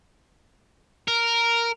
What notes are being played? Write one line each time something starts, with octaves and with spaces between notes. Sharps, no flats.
A#4